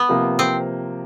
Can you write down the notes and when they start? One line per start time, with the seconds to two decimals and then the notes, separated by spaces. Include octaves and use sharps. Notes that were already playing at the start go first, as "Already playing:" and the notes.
Already playing: B3
0.09 C3 F3 A#3
0.39 C4